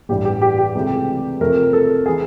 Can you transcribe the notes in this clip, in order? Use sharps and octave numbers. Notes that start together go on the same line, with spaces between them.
A1 G2 E3 G4
G4
G4
G4
C#2 C3 E3 A3
F2 C3 F3 A3 A#4
A4
E3 G#4